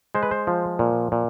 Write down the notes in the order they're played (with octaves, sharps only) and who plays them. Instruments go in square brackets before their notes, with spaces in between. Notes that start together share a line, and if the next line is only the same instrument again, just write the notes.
[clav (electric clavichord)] G#3 C5
B4
C5
F3
A#2
A#2